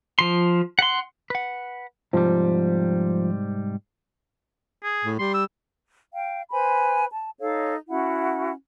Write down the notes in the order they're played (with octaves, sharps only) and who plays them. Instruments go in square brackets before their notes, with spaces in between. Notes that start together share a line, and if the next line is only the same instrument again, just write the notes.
[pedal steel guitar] F3 C6
F#5 C6
[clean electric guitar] B4 F#5
[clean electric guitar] G#2 C3 G3 [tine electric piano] F3
[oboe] G#4
[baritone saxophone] A2
[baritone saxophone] G3 [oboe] C6
[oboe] E6
[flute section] F5 G5
B4 C5 G#5 B5
A5
D#4 A4 C#5 F5
C#4 E4 F#4 F#5